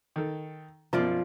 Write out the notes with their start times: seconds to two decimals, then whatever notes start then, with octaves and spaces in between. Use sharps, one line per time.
0.16 D#3 A4
0.93 F#2 B2 F3 F4 D5